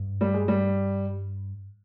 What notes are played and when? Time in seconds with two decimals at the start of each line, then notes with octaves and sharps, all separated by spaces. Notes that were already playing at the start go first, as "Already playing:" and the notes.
Already playing: G2
0.21 G3
0.34 G#3
0.48 G3